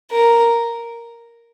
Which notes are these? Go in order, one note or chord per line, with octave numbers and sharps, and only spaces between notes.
A#4